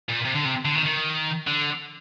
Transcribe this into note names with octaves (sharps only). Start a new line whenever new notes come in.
A#2
C3
D3
C3
D3
D#3
D#3
D3